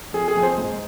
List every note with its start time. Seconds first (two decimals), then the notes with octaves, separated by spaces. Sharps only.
0.13 F2 G#4
0.28 G#4
0.35 F2
0.43 C5
0.58 G#2